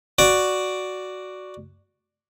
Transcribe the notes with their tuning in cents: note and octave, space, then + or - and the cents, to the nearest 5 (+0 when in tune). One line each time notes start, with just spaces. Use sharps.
F#4 +0 D5 +0